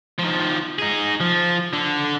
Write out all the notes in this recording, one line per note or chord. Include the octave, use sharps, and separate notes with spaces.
D#3 F3
D#4 G#4
F3
D3 D4